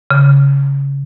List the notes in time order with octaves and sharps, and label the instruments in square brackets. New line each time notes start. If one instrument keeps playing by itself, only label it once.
[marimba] C#3